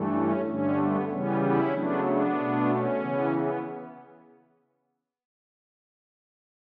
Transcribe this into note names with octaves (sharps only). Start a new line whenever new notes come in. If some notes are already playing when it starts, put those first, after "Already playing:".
Already playing: G2 E3 A3
C#4
G2 D3 A3 C#4
B3
C#3 E3 G3 B3 C#4
C#4 E4
C#3 F#3 A3 B3 D4
B3 D4
B2 A3
C#4
C#3 E3 B3
B3